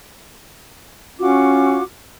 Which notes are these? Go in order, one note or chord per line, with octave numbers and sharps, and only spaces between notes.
C#4 F4 F#4 D6